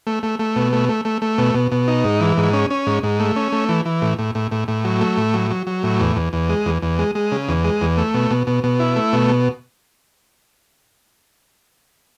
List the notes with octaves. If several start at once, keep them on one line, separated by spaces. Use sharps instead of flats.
A3
A3
A3
B2
A3
A3
A3
A3
B2
B2
B2
D#4
G#2
E3
G#2
C#4
C#4
G#2
G#2
A3
C#4
A3
E3
E3
A2
A2
A2
A2
A2
F#3
A3
A2
F#3
F#3
F#3
A2
E2
E2
E2
G#3
E2
E2
G#3
G#3
C#3
E2
G#3
E2
A3
B2
B2
B2
B2
E4
A3
B2